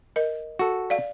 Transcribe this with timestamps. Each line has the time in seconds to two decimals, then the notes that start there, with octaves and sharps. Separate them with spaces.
0.16 A#4 D#5
0.59 F#4 A4
0.90 D5 F5